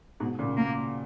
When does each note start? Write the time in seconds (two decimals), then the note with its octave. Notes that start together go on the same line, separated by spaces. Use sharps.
0.20 G#2 B2
0.39 A#2 C#3
0.57 A#3